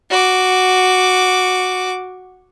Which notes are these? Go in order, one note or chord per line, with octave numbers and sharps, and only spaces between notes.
F#4 D6